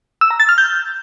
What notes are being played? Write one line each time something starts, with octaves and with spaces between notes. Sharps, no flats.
E6
A#5
A6
F6
G6